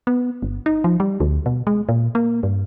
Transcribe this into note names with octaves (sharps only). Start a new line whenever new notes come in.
B3
G1
D#4
F3
G3
D2
B2
G#3
A#2
A#3
G2